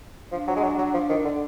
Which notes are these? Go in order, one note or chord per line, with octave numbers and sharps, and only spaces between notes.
F3 D4
F#3
G#3
F#3
F#3
F3
D#3
D3